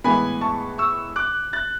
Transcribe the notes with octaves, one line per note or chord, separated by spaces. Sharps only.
A2 E3 G#3 B3 G#5 B5
A5 C#6
C#6 E6
D6 F#6
F#6 A6